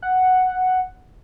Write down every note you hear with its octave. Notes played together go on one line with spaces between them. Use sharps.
F#5